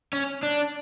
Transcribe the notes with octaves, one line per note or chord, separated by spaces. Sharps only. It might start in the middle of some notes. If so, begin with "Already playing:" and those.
C#4
D4